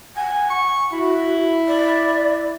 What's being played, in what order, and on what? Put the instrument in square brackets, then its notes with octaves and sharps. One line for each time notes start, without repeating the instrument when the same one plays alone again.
[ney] F#5 [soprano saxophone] G#5
[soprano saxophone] C#6
[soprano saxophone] E4 [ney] F#4
[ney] D5